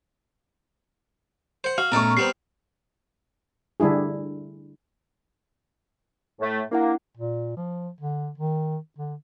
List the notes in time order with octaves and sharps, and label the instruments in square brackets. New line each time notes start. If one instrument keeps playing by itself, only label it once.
[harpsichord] C5 F#5
[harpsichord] F#4 [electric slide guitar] F5 [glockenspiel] F6
[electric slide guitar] A#2 B3 C#4 [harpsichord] A3 D5 D#5 [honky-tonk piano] A#5 C#6
[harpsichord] G3 B3 C4 [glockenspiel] C7
[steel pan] D3 G3 D4 E4 G#4
[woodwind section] A2 A3
[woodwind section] A#3 [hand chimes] D4 E4 F#5
[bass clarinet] A#2
F3
D3
D#3
D3